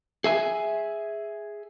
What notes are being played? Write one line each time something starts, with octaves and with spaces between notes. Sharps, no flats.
G#4 E5 G#5